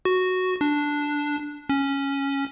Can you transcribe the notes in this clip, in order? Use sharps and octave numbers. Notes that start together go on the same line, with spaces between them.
F#4
D4
C#4